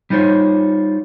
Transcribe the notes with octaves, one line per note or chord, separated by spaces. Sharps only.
G3 D#4 F4 C5 C#5